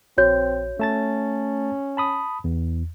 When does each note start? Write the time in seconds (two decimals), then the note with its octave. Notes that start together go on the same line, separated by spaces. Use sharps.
0.18 A#1 C4 F#4 C#5 G6
0.79 A3 C#4 A5 A6
1.97 A5 B5 D#6
2.44 E2